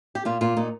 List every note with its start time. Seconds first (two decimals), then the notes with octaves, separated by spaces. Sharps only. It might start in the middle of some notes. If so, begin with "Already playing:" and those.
0.15 G4
0.25 A#2 F4
0.41 A#2 F4
0.57 A#2 D#4